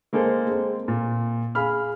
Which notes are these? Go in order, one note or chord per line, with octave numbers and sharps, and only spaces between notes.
G#3 A#3 G#4 A4 C5
G#3 C4
A#2
G#4 F5 B5 F6